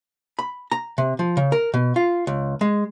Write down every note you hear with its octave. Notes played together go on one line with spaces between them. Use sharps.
B5
A#5
C3
F3
C#3
A#4
B2
F4
C#2
G#3